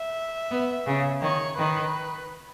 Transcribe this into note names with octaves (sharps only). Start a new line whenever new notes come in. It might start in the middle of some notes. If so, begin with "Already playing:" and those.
Already playing: E5
B3
C#3
D#3 C#5
D#3 B4